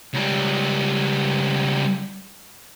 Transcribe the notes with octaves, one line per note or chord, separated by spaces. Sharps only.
C#2 G3